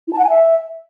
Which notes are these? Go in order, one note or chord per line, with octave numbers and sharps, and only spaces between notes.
E4
A5
F#5
G#5
E5